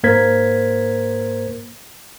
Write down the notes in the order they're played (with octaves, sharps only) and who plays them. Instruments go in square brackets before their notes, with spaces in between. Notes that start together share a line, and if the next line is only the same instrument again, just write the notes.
[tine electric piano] G#2 A#3 A#4 C5 G#6 B6